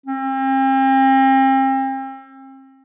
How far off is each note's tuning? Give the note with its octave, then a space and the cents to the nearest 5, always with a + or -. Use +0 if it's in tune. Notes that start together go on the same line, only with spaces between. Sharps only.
C4 +40